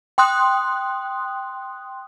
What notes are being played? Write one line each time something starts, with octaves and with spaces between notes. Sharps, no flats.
G5 C6 D#6 F#6